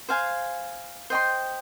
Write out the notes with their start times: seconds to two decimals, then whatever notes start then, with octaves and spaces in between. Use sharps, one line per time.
0.09 C5 F5 G#5
1.10 C5 D#5 G5 C6